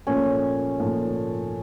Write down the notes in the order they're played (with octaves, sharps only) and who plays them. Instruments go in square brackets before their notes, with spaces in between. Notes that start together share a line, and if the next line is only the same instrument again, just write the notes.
[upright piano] A#2 F3 A3 [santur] C#4
[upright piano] A#2 F3 A3